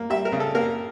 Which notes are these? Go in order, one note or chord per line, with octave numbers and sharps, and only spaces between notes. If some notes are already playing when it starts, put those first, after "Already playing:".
Already playing: A#3
G3 E5
A#4
C#3
A4
A#3 A#4